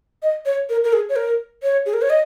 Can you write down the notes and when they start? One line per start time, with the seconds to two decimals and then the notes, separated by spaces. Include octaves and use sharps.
0.22 D#5
0.46 C#5
0.70 A#4
0.84 A#4
0.93 G#4
1.09 C#5
1.16 A#4
1.63 C#5
1.86 G#4
1.94 A#4
2.02 C#5
2.10 D#5